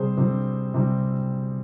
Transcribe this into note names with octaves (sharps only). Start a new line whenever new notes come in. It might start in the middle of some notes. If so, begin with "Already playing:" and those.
Already playing: C3 G3 C4 G#4 C5
C3 G3 C4
C3 G3 C4